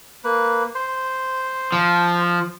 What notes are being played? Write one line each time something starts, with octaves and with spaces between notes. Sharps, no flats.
A#3 B4
C5
F3